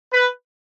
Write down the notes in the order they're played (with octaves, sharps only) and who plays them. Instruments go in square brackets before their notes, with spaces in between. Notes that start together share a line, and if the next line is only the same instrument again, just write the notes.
[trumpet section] B4